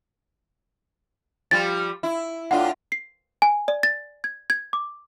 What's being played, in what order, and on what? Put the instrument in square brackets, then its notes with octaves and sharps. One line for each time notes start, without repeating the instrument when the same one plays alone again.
[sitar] F3 G3 [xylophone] A6
[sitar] E4
[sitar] A2 D4 F4 [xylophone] F#5
[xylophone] C7
G#5
D5
A6
G#6
G#6
D6